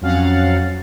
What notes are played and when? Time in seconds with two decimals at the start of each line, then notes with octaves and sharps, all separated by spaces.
0.01 F2 F#3 C#4 F5 F#5 A6